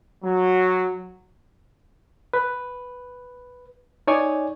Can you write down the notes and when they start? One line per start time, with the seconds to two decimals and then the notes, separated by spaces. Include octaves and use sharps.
0.23 F#3
2.34 B4
4.07 D#4 C#5 D5 G#5